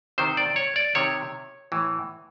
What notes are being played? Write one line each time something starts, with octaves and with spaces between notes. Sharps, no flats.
C3 D#3 C5
D5
C#5
D5
C3 D#3 C#5
A2 E3